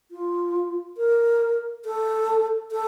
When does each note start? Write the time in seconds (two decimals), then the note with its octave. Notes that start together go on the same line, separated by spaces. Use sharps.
0.11 F4
0.97 A#4
1.85 A4
2.72 A4